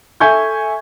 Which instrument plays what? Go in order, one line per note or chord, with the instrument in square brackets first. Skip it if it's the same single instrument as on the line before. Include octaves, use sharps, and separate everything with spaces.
[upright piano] A4 E5 G#5 C#6 G6 G#6